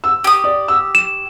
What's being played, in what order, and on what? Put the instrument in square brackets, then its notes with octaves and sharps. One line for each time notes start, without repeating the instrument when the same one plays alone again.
[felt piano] E6
[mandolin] G4 D#6
[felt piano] D5
E6
[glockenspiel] E7